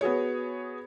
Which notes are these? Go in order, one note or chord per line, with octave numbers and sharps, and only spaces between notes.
B3 F#4 G#4 C#5